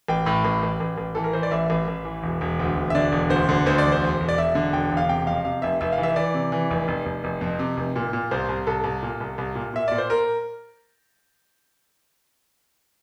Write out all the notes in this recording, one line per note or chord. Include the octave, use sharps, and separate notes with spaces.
A1 G5
A2
A1
A1
A1
A1
E3 A4
A#4
E3 C5
D5
A1 E5
A1
A1
E3
E1
E1
D2
E1
E5
D3 D5
E1
D2 C5
D3
D2 C5
D5
E1
C5
E1
E1
D5
E1 E5
D3
E1 G5
E1
F5
C3 G5
F2 F5
C3 F5
F1 E5
F1 E5
F5
E3
E5
E3 D5
C3
E3
F1
F1
F1
F1
F2
C3
F1
A#2
A#2
C2 C5
C2
C2 A4
C2
A#2
C2
C2
A#2
A#2 E5
A#2 D5
C5
A#4